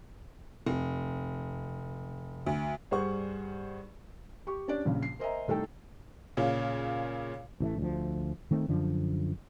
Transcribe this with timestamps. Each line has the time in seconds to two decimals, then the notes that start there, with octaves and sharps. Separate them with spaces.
0.66 F1
2.46 D2
2.91 G2 G3 G#4 C5 F#5 C#6
4.47 G4 C#6
4.68 C#4 D4 G4 D5
4.85 A#1 C#3
5.02 C7
5.19 A#4 C5 D#5 E5 G#5 A#5
5.48 C2 A3 D#4 A4 G5
6.37 A#2 C#3 C#4 F4
7.60 A1 E3 G3 A3
7.78 D2 F3
8.51 D#3 A3 C4
8.68 F#2 D3 F3